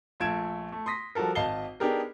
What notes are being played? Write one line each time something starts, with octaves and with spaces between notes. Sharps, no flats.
A#1 A3 F4 G#6 D7 E7
A3
C6 D#6 A#6 B6
F3 G3 F#4 A4 A#4
G#1 D#5 F5 A5 C7 G7
B3 D4 D#4 G4 G#4 A#4